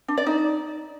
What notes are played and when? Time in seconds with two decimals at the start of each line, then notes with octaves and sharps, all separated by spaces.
0.08 D4
0.17 D5
0.27 D#4